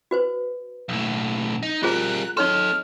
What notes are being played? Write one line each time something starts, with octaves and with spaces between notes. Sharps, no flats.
F#4 B4 C5
B1 A2
D#4
G3 F4 G#4 A#4 C5 F#6
D#4 A4 C#5 D#5 C6 F6